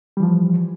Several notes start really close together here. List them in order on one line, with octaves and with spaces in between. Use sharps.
G3 E3 F3